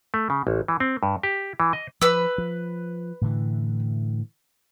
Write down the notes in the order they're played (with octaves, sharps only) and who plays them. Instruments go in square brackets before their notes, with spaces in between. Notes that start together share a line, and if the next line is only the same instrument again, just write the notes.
[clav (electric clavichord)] A3
C#3
A1
E3
C4
G2
G4
E3
D#5
[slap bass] F3 [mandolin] B4 E6
[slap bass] F3
A2 D3 E3